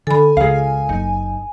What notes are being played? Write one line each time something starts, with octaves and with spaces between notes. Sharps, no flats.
D3 A4 G#5 B5
C#2 G#4 A#4 F5
F#1 D#4